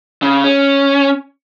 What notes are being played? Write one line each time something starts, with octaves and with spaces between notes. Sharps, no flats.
C#3
C#4